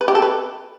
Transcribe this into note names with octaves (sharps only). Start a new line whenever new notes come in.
B4
G4
A4
B4